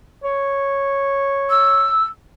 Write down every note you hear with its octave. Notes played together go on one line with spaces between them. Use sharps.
C#5
E6